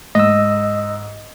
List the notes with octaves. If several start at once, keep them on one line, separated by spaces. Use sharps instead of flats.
G#2 D#5 E6